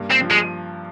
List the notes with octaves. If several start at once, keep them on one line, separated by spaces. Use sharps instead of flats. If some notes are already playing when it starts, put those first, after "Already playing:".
Already playing: G2 A#3
C4
F3
G#3